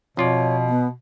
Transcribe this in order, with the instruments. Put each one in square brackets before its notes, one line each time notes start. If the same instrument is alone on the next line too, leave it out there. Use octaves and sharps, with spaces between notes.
[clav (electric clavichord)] F2 F4 D5 [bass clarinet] B2 [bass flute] C#5
[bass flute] B3